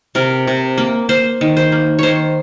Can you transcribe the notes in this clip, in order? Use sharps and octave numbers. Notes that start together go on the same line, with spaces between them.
C3 A#4
C3
A#3
A#3 C5
D#3
C5
A#3
D#3 C5 C#5